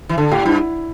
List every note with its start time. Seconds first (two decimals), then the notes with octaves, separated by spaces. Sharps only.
0.09 E3
0.17 D3 A4
0.31 A2 G4
0.45 G2 E4